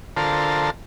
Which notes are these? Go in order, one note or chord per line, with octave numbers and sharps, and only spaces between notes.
D3 F4 A4 A#4 C5 A5